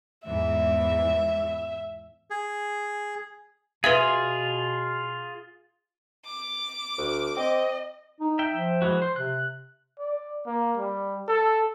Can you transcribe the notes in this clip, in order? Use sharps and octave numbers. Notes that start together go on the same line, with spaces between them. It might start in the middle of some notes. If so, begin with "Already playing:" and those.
E2 G#2 E3 E5
G#4
B2 F4 G#4 B4 E5 F5
D6
D2
C4 D#5
D#4
E5 G5
F3
E3 G#3 F#4
C5
C3 F#6
D5
A#3
G3
A4